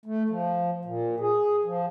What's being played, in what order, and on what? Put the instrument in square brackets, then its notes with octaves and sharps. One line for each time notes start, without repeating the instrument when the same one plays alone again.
[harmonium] A3
F3
A#2
G#4
F3